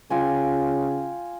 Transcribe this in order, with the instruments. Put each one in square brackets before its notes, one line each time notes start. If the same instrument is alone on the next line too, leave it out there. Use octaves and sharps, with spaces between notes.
[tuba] C#3 [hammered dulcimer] F4 G5 G#5